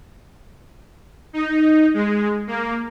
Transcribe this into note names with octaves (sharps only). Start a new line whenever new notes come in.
D#4
G#3
A#3